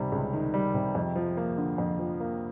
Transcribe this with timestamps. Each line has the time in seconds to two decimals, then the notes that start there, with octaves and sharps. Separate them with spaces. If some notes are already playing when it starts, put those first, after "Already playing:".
Already playing: C#2 C3 D#3 G3
0.12 C#2
0.33 D#3
0.54 G3
0.74 C3
0.95 F2
1.15 F3
1.37 A#3
1.58 D3
1.78 F2
1.99 F3
2.20 A#3